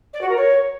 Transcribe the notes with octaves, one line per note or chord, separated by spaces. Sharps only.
D5
F#4
A#4
C#5